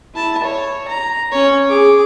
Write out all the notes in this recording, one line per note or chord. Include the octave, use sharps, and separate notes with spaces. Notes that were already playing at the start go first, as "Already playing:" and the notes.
E4 A5
C#5
A#5
C#4 C#5
G#4 D6